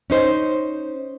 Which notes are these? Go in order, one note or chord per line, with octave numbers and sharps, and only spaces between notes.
C#4 D#4 C5